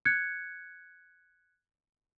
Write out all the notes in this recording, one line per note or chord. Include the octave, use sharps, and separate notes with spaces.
F#6 G#6 C#7